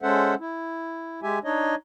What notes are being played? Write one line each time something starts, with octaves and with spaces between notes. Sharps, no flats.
G#3 C#4 A4 C5 E5 F#5
E4
G#3 G4 E5 G#5
D4 D#4 C#5 D#5